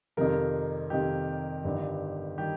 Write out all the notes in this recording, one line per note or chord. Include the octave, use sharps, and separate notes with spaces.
F2 C3 D#3 G3 A#4
F2 C3 D#3 G3 G4
G1 G2 D#3 G3
D#3 G3 G4